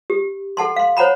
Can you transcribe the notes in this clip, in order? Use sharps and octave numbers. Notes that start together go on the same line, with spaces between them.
G4
A4 F#5 A5 C6
F5 C6
C5 C#5 F#5 A#5 B5